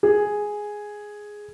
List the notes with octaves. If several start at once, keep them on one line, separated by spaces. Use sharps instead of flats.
G#4